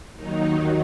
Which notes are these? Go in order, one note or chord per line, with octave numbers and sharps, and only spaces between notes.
D#2 D#3 F#3 D#4